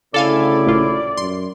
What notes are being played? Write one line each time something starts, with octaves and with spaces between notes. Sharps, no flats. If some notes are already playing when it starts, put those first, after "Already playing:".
D2 A2 C#3 E4 A4 D5 F5 G#5
A1 A#2 F4
F#2 C6